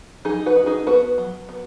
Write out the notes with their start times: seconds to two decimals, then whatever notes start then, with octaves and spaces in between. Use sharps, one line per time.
0.25 F#3 D#4 G#4
0.46 F#4 B4
0.56 D#4
0.66 D#4 G#4
0.87 B3 F#4 B4
1.18 F#3
1.49 B3